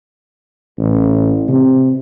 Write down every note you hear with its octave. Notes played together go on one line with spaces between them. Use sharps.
A1
C3